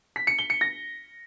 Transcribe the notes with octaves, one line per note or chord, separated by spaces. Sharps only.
B6
C#7
G7
C#7
A#6